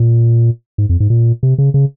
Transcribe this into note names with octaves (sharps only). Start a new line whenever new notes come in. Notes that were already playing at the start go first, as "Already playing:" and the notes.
Already playing: A#2
G#2
F2
G#2
A#2
C3
C#3
C#3